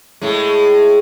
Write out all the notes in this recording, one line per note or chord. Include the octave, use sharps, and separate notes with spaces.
A2 G#3